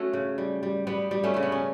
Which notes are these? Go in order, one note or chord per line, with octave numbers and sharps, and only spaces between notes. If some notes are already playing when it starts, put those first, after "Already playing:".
Already playing: A3 C#4 F#4 A4
C#3
G3
G3
G3 B3
G3
A3 C#4
C#3 A3
B3
C#4